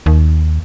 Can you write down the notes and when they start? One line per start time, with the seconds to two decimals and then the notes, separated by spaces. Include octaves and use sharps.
0.06 D#2